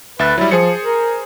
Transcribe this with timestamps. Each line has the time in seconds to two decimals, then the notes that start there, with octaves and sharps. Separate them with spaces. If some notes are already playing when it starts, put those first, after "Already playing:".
0.19 D2 B4 E5 A6
0.38 F#3 G3 E4
0.51 F3 G#4 C5 C#7
0.84 A#4